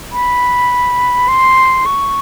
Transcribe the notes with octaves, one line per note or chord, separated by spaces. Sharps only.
B5
C6
C#6